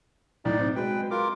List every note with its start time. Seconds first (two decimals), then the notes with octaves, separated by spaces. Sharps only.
0.45 B1 A2 D#4 D5
0.59 C4
0.76 F#3 G#3 B4 G5
1.11 F4 A#4 D6